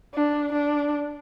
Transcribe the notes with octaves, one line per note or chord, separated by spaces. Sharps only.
D4
D4